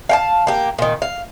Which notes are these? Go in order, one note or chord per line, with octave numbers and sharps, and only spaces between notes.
F5 G5 A5
A#3 G4
A#2 D#3
F5